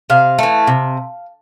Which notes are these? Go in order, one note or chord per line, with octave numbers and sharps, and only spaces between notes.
C3 F5
E3 A3
C3